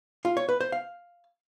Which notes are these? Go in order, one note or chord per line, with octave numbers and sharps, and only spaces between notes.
F4
C#5
B4
C5
F5